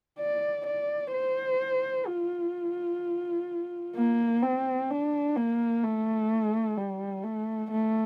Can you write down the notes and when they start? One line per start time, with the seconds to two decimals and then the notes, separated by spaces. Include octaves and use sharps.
0.19 D5
0.67 D5
1.14 C5
2.07 F4
3.96 A#3
4.43 C4
4.90 D4
5.36 A#3
5.83 A3
6.77 G3
7.24 A3
7.71 A3